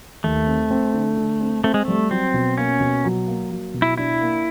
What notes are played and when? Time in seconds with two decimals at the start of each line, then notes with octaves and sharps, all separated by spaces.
0.24 D#2 A3
0.47 C4
0.71 C4
0.94 D3
1.17 D3
1.41 C4
1.64 A3 C4
1.74 G#3
1.85 G3 A3
2.11 F#3 C4
2.34 B2
2.58 A#3 C#4
2.81 B2
3.05 F#3
3.27 A#3
3.51 F#3
3.74 B2
3.82 E4
3.97 D4 E4
4.21 A#3